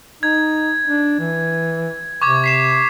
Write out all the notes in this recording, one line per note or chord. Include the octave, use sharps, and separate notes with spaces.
D#4 G#6
D4
E3
C3 C#6 D6 G#6
B6 C7 E7